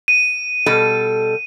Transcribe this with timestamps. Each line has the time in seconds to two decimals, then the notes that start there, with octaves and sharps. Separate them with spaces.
0.08 D#7
0.66 B2 G3 A4